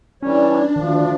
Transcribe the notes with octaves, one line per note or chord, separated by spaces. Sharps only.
E3 G3 C#4 D4 C#5
D2 D#3 F3